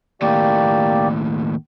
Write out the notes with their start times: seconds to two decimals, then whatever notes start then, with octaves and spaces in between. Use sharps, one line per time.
0.22 D#2 A2 A#3 G4 D5